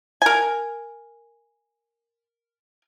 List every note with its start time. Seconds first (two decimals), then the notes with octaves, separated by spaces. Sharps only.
0.22 A#4 G#5